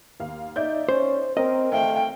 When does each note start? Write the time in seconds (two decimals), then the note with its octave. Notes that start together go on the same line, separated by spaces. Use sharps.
0.20 D#2 F5
0.56 D#4 D5 E5 G6
0.89 C#4 C5
1.37 C4 A#4 D#5
1.73 A3 E5 F5 G5